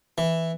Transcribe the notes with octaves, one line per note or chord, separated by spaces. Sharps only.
E3